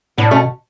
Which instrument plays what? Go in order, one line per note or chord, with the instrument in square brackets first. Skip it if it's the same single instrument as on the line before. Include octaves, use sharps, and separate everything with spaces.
[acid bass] A2 [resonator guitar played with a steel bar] B3 D4
[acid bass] B2 [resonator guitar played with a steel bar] A3 C#4